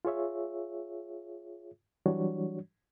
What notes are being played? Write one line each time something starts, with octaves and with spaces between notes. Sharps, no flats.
F4 G#4 C#5 E5
E3 F#3 G3 D4 F#4 C#5